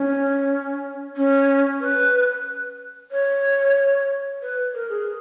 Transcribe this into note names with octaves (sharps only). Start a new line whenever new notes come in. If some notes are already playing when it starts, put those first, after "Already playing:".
Already playing: C#4
C#4
B4
C#5
B4
A#4
G#4